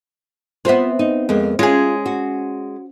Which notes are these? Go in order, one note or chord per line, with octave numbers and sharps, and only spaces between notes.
B3 C4 F4 C5 E5
D#4
F2 G#3 A#3
G#3 C#4 F4 G#4
F#4